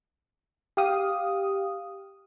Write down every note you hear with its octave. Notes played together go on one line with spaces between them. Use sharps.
G4 F5 D#6